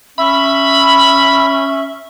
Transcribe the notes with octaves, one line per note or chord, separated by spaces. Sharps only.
C#4 E5 B5